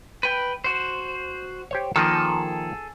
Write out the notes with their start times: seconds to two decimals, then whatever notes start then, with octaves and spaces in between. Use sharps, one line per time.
0.23 B4 G5
0.64 F#4 C5
1.71 G4 C5 C#5
1.96 D#3 F3 A#3 G#4 A4